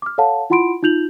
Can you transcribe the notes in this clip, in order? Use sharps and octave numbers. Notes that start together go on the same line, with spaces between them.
D6 F6
A4 C#5 F5 F#5 A5
E4 F4 F#5 B5 C6 D7
D#4 F4 G6 F7 F#7